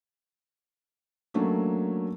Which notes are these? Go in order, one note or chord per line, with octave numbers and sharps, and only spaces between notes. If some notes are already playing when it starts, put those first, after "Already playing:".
F#3 A3 A#3 C#4 D4